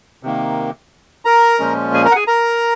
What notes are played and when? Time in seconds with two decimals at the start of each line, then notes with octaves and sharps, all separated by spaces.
0.23 C3 D#3 A#3
1.25 A#4 A#5
1.59 A#2 F3 G#3 C#4
1.94 G#4 G#5
2.05 A#4 A#5
2.11 F#5
2.16 G#4 G#5
2.27 A#4 A#5